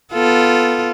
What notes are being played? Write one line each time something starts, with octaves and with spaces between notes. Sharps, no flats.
B3 F4 A4